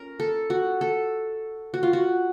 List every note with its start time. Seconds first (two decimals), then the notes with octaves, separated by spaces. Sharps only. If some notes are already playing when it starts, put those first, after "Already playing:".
Already playing: C#4 A#4
0.20 A4
0.50 F#4
0.81 A4
1.74 F#4
1.83 F4
1.93 F#4